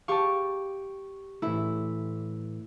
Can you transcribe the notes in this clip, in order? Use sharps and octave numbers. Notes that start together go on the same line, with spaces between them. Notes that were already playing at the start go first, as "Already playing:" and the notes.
G4 F5 A5 C#6
A2 E3 A3 E4